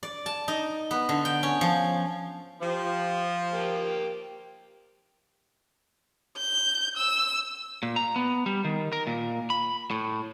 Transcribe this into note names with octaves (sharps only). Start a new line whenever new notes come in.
D5
A5
D#4
B3
D3
G5
C#4
F3
F3 G4
A#3 G4
G6
E6
A#2
A#5
B3
G3
D#3
A#4
A#2
B5
A2